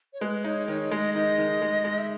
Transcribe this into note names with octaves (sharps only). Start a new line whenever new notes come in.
C#5
G#3 B4
D#4 C#5
D#3 C#5
G#3 D#5
D#3 D#5
D#3
G#3
G#3
E5